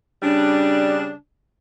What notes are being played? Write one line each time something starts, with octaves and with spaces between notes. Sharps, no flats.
C#3 G3 D4